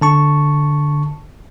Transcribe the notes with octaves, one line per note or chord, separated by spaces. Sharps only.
D3 A5 C#6